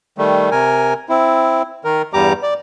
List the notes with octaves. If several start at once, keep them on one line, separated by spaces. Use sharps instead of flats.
D#3 G3 A3
C3 A#4 G#5
C4 E4
D#3 A#4
E2 G2 G3 G4 A#5 D6
D5